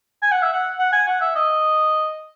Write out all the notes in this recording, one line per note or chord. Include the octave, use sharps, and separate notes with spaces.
G#5
F#5
E5
F#5
F#5
G#5
F#5
E5
D#5